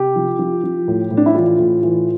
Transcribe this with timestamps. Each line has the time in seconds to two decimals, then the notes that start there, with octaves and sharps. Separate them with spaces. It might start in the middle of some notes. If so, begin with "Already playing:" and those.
Already playing: C3 G4
0.16 F3
0.39 F3
0.64 F3
0.88 A2
1.11 A2
1.17 D4
1.26 E4
1.35 E3 F4
1.59 A2
1.83 E3